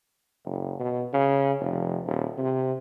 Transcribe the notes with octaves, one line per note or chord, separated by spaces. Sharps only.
F#1
B2
C#3
F1
D#1
C3